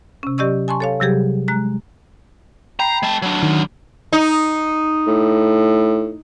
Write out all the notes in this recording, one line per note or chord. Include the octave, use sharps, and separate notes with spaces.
C3 C#4
F#3 G4 D5 D#5 C#6 E6
G#5 A5 C6 C#6
A4 C#5 F5
C3 F#3 G3 G4 G#4
G#3 A#5 F#6
G5 A#5 B5 C7
G#3 A5
F#3 D4
D#3
D#4
A2